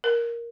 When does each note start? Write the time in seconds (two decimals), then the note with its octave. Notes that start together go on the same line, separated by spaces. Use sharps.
0.04 A#4